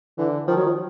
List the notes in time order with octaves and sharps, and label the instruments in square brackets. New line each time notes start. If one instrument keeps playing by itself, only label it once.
[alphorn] D3 [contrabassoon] E3
[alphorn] D#3 [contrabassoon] F3
[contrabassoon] F#3
F3